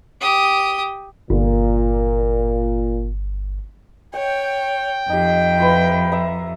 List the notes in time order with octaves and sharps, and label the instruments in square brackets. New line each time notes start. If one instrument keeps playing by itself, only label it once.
[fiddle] G4 D#6
[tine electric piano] G1 [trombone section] A#2
[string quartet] C#5 [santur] F#5 [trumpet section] G5
[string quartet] F2 [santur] D#4 G4
[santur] E4 F4 B4
E5 A#5